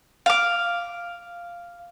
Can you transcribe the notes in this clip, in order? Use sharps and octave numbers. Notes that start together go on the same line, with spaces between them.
F5 D6